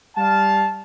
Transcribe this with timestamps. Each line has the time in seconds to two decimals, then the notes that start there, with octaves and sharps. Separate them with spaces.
0.16 G3 F5 A5